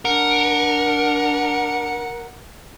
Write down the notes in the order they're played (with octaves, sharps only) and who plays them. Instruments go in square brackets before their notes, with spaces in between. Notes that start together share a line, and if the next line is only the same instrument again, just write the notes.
[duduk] D4 [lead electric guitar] A#4 [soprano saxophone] F#5